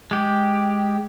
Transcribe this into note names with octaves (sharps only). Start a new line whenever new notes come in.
G#3 G4